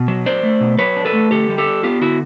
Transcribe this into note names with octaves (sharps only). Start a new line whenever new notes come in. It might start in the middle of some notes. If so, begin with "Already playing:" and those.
Already playing: B2
F#3
D4 C5 D5
A3
B2
F#3 B4 C#5
D4
A4 B4
A3
D3 G4 A4
G3
G4 A4
D4
B3 F4 G4
D3 E4 F#4